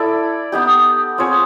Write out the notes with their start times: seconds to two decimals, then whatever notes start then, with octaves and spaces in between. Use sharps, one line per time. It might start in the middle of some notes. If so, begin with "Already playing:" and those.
Already playing: E4 A4 D5
0.52 B3 D#4 G4
1.18 C4 F4 G#4 C#5